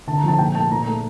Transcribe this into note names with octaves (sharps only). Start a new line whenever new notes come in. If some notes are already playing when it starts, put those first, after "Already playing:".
D3 A5
A#5
F3 A5
A#2 G5
A3 A5
A#2 A#5
A#5
A3 A5